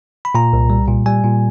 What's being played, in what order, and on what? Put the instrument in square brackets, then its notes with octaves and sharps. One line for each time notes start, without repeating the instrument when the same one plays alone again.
[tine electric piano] B5
A#2 A#5
C2
G3
A#2
G3 G#5
A#2